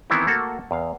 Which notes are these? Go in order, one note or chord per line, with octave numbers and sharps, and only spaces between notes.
D#3 E3 B3 C4 E4
A3 A#3 F#4 A4
E2 F5